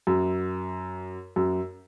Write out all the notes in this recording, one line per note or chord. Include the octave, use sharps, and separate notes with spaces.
F#2
F#2